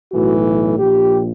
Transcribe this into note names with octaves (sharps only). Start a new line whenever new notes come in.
B1 A2 E3 F#4
A#1 A#2 F3 G4